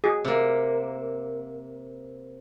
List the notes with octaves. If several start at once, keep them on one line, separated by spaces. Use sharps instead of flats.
F#4 G#4
C3 A#3